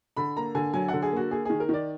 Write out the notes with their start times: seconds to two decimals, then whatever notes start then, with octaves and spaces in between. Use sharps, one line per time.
0.17 D3 B5
0.37 A#3 A#5
0.55 D3 G#5
0.73 F#3 G#5
0.88 D3 F#5
1.02 G#4
1.12 A#3 F#4
1.31 A#3 G#4
1.45 D#3 G#4
1.60 A#4
1.69 D#3 D5